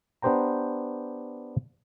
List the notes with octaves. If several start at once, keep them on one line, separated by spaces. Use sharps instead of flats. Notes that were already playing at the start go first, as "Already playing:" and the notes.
B3 D4 G4 C5 G5 A#5